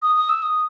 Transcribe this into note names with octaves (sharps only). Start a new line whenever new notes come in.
D#6
D#6
E6
D#6